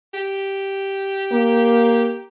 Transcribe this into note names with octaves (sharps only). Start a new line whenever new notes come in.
G4
A#3